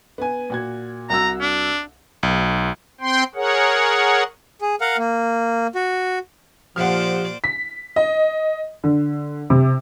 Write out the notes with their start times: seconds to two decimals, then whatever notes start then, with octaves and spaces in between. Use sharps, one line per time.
0.18 B3 G#5
0.50 A#2 F#4 G#6
1.10 C2 F#4 A#5 E6
1.41 D4
2.23 B1
3.01 C4 G5 C6
3.35 G#4 A#4 C#5 F#5
4.61 G#4
4.81 A#4 F5 F#5
4.98 A#3
5.75 F#4
6.76 A#2 F3 G4 C5 D5 F#5 F6
7.44 B6
7.96 D#5
8.84 D3
9.50 C3